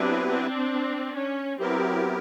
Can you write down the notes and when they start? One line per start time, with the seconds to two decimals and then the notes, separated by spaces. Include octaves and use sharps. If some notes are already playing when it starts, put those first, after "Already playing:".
Already playing: F#3 B3 C4 D4 E4 G4 B4
0.29 C4 D4
1.16 C#4
1.59 F#3 B3 C4 E4 G4 A#4